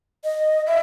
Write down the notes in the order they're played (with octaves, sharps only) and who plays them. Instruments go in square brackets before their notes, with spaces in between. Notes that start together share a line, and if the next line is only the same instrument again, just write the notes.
[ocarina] D#5
[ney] E5